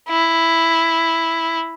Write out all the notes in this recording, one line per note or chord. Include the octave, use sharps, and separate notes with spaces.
E4